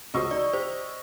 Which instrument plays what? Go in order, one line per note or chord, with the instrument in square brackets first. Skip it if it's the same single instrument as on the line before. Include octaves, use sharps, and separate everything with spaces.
[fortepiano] C#2 F#4 C5 [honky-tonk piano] D#5 C#6 E6
[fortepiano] D#4 [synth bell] D5
[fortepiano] G4 [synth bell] C5